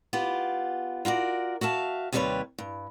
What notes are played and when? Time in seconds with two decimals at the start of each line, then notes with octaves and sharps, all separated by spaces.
0.13 B3 F4 G4
1.05 F4 F#4 A#4 D5
1.61 F#4 E5 F5 A5
2.12 D#2 C3 G3 F#4 B4 C#5
2.58 G2